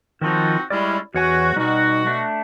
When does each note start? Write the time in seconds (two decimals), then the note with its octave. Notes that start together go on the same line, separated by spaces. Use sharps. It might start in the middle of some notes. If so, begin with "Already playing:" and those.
0.21 D#3 F3 C4 D#4 F4 F#4
0.70 G3 G#3 C#4 E4 D5
1.14 E2 F#4 C#5 G#5
1.56 B2 G3 D#4 F#4
2.07 A3 D4